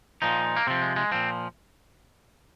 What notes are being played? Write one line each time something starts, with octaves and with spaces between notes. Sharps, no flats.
A#2 F3 D#4
A#3
C3 F3 C4
G#3
G#3
A#2 F3 C4